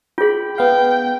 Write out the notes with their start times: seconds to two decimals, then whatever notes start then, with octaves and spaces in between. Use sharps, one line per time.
0.18 F4 G#4 G5 B5
0.58 B3 F5 G5